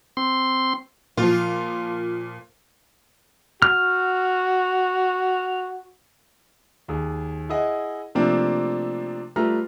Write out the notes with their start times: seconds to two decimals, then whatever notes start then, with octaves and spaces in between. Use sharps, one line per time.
0.17 C4 C6
1.17 A#2 F3 F4
3.62 F#4 F6
6.88 D#2 G#4
7.49 E4 G#4 D#5 F#5
8.15 C3 F3 A3 A#3 C4 D4
9.36 G3 A3 F4 B4 A#5 F6